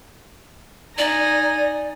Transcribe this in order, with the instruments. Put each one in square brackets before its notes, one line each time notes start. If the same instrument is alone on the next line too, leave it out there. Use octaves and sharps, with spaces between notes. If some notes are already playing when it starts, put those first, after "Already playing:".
[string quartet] D#4 G#5 A#6 [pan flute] D5